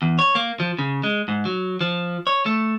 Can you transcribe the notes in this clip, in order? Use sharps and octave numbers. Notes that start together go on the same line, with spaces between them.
E2
C#5
A#3
F3
C#3
G#3
G#2
F#3
F3
C#5
A3